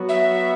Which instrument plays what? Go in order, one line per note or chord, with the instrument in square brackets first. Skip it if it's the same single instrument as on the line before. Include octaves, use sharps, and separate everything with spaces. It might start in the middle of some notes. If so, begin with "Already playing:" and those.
Already playing: [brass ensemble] F#3 B3 F#4
[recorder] E5